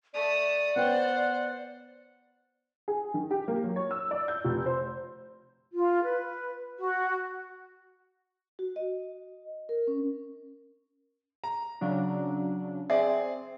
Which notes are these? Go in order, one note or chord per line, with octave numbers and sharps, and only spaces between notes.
A3 D5 D#6
B3 C5 C#5 F#5 G5
G#4
D#3
G4
A#3
F#3
C#5
E6
D5
G6
F1
C5
F4
B4
F#4
F#4
D#5
A#4
C#4
A#5
C#3 F#3 D4
C4 G#4 D5 E5